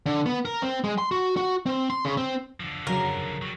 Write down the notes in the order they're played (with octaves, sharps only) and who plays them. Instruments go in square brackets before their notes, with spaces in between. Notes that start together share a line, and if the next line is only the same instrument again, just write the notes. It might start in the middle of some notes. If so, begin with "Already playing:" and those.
[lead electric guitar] D3
B3
A#4
C4
G#3
C6
F#4
F#4
C4
C6
C#3
C4
[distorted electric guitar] D3 F3
[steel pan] C#3 F#3 [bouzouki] A#4
[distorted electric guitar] F#3 G3